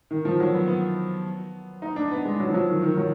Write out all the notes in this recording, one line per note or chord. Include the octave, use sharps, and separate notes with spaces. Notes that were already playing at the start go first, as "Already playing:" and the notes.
D#3
F3
F#3
B3
B3
D#4
D4
B3
G#3
F#3
F3
F#3
D#3
D#3
F#3